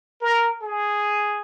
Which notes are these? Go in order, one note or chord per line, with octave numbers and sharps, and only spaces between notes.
A#4
G#4